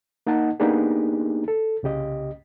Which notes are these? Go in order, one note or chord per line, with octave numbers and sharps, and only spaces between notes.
A#3 D#4 D#5 F#5 A5
A#3 B3 D4 D#4 G4 G#4
A4
C2 C#3 G4 D#5